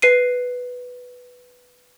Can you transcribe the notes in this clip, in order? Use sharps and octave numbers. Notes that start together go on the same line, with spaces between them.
B4 C7 D#7